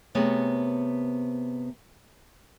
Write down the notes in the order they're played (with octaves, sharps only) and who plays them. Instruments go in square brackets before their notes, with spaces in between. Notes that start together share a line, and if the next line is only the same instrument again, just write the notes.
[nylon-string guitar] C3 A3 B3 G#4 A#4 C#5